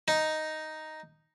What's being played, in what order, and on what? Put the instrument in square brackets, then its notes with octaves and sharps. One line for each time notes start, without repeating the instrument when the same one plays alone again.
[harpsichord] D#4